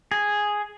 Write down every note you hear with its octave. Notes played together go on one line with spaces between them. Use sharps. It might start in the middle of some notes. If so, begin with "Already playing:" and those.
G#4